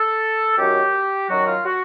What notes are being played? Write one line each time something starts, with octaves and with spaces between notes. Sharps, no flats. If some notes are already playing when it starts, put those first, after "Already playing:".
Already playing: A4
F#2 D#3 F#3 G4
F#2 D#3 F#3 F#4
F4
F#4